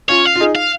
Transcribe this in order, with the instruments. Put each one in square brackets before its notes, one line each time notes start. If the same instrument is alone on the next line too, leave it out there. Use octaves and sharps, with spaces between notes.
[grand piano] C#4 F4 [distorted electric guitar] C#5
[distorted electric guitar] F5
[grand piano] F4
D#4 G#4
[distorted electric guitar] F5